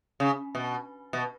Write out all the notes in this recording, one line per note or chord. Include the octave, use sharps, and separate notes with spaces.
C#3
B2
B2